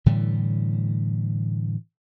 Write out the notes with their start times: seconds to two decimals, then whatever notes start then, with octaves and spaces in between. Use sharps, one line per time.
0.06 A2 D3 E3 G3